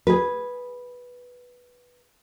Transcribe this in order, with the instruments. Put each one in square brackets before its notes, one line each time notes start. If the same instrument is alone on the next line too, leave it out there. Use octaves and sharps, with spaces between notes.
[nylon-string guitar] G#4 B4